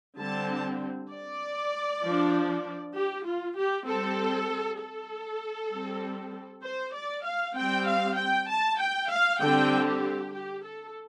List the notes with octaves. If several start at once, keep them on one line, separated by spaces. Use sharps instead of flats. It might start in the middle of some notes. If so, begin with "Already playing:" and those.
D3 G3 C4 A5
D5
F3 D4
G4
F4
G4
G3 C4 A4
A4
G3 C4
C5
D5
F5
G3 C4 G5
F5
G5
A5
G5
F5
D3 G3 C4 G5
G4
G4
A4